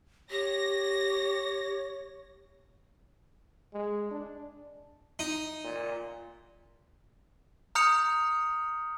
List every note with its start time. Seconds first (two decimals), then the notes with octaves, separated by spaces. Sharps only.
0.30 G4 C#5 A#6
3.73 G#3
4.11 D4
5.19 D#4
5.64 A#2
7.75 A#5 D#6 F6 G6 C#7 F7